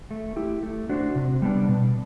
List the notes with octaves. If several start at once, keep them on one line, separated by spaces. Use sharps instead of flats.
A3
E4 G4
A3
D4 F#4 C5
C3
G3 B3 D4
B2